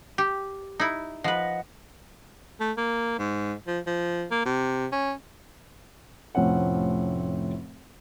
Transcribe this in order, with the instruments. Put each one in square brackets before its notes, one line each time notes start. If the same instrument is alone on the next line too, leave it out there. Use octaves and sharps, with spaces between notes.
[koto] G4
D#4 E4
[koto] F3 B4 [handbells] D#5 F#5
[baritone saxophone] A3
A#3
G#2
F3
F3
A#3
C3
C#4
[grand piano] F1 A2 F3 C4 C#4 F#5